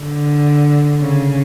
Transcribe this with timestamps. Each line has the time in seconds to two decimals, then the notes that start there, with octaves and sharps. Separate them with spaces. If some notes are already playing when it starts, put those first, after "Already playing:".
Already playing: D3
1.01 C#3